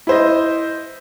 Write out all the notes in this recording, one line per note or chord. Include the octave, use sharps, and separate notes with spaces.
E4 C5 D#5